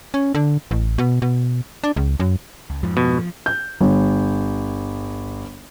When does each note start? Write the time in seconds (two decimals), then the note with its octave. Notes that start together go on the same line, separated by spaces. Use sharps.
0.14 C#4
0.35 D3
0.71 A1
0.98 B2
1.22 B2
1.84 D4
1.96 C#2
2.20 F#2
2.70 C#2
2.83 F2 G#2 F3
2.97 B2
3.18 F3
3.46 G6
3.81 G1